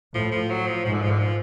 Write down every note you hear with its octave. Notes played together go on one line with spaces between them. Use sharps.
A2 F3
F3
F#3
F3
G#2 F3
D3
F3
D3
F3